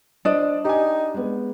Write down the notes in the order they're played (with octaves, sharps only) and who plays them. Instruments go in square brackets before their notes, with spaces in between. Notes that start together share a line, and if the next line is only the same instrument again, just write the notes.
[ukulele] D4 D#5 [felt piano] C5 D5
[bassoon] D#4 [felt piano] G4 G#5
[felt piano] G#3 B3